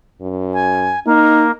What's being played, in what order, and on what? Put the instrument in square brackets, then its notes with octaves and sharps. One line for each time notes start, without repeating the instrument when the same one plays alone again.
[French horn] F#2
[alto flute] G#5
[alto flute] A#3 [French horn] D#4